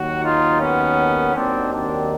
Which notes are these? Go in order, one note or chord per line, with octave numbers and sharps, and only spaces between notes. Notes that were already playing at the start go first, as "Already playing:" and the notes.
Already playing: D#2 D#3 F#3 F#4
D#4 F4
B3 C#4
D#2 D#3 F#3 C4 D4
C4 D4